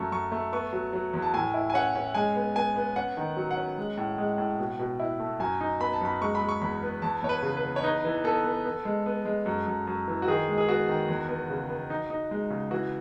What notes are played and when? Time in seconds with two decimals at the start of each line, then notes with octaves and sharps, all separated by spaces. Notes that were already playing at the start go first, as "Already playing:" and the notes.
Already playing: F#2 A3 C#6
0.12 F#2 C#6
0.32 A3
0.52 B3 C#6
0.73 F#3
0.93 F#3
1.14 E2
1.22 A5
1.34 A2 G#5
1.54 E4
1.70 G#5
1.74 C#4 F#5
1.95 C#4
2.15 G#3 G#5
2.36 B3
2.55 B3 G#5
2.76 B3
2.96 C#4 F#5
3.17 D#3
3.36 F#3
3.51 F#5
3.57 C#4
3.78 G#3
3.97 A2
4.18 G#3
4.38 A2
4.59 B2
4.79 B2
5.00 E4
5.20 A3
5.40 F#2 G#5
5.61 D#4
5.80 B3 B5
5.93 A5
6.01 F#2 B5
6.21 G#3 C#6
6.35 B5
6.41 G#3
6.49 C#6
6.61 E2 B5
6.83 B3
7.02 E2 A5
7.22 E2 C#5
7.29 B4
7.43 C#3
7.57 B4
7.63 E2
7.76 C#5
7.84 D#4 B4
8.04 E3
8.24 B3 A4
8.44 B3
8.66 B3
8.85 G#3
9.06 B3
9.25 G#3
9.46 F#2
9.67 F#2
9.87 F#2
10.08 E3
10.22 F#4
10.28 D#3 G#4
10.48 G#3
10.58 G#4
10.69 B3 F#4
10.89 D#3
11.09 E2
11.29 B3
11.50 C#3
11.70 B3
11.90 D#4
12.10 D#4
12.31 G#3
12.50 C#3
12.71 E3 F#4